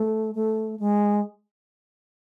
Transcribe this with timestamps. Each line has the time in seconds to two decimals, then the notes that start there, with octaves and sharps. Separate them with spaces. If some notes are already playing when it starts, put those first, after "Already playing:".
Already playing: A3
0.35 A3
0.79 G#3